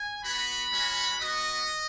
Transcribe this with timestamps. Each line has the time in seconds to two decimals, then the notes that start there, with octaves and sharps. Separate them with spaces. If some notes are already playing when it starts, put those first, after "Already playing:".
Already playing: G#5
0.24 B3 F#4 B5
0.72 G#3 C#4 F#4
1.20 B3 F#4 D#5